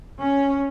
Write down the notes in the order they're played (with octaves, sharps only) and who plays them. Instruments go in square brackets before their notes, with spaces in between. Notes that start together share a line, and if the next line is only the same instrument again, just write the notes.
[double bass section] C#4